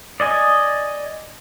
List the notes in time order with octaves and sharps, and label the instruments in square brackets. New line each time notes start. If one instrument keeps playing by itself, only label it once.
[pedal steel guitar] D5 D#5 G#5